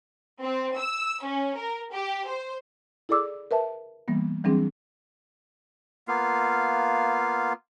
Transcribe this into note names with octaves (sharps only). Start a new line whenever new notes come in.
C4
E6
C#4
A#4
G4
C5
E4 G#4 A4 D5 D6 E6
A#4 B4 E5 A5
E3 G3 A#3 B3
E3 F#3 G3 C4 D4 G#4
A#3 B3 F4 F5